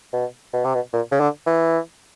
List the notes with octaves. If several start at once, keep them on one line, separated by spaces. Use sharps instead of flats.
B2
B2
C3
B2
A#2
C#3
D3
E3